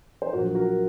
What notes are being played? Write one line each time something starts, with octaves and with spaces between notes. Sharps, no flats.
C5
A#1 A#2 F#3 F#4 A#4
F#4 A#4